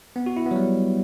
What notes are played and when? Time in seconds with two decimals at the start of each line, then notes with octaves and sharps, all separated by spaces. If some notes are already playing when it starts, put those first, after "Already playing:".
0.16 B3
0.26 F#4
0.37 E4
0.46 B3
0.51 F#3
0.56 G3